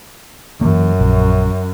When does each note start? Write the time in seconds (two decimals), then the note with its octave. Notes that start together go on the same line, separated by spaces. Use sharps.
0.61 F#2 E3 A#3
0.99 A#1